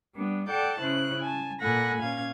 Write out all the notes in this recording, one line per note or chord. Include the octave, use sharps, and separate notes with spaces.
G3 B3 D4
A4 D5 F#5 G5 A5 G6
C#3 C#4 E4 C5 F#6
G#5 A5
A#2 A4 F#5 G#5 B5 A#6
A#2 C#4 F5 G#6